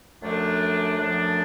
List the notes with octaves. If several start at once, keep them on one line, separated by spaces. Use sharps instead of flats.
F#2 D3 F3 A3 D4
F#2 D3 F3 A3 D4